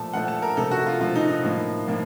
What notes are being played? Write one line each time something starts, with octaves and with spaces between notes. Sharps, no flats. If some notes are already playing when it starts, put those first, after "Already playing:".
Already playing: A#2 F3 A3 A5
A#2 F3 A3 F#5
A5
A#4
C3 F3 A3 A4
F#4
F4
C3 F3 A3 F4
D#4
D#4
A2 F3 A#3
A2 F3 A#3